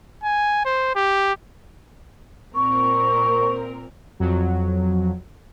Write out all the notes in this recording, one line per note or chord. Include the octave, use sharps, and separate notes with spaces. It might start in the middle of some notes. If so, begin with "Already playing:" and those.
G#5
C5
G4
A#2 C4 A#4 C#6
F2 F#3